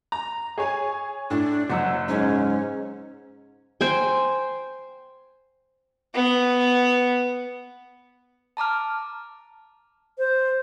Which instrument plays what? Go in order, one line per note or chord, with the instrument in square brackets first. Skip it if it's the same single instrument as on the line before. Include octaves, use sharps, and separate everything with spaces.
[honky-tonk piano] A#5
G#4 C#5 G#5
[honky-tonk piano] A2 [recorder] D4
[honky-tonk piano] F#1 F#3 E6 [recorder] F#5
[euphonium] G#2 [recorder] C#4
[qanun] C5 G5 G#5
[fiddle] B3
[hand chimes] A5 A#5 D6 F6
[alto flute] C5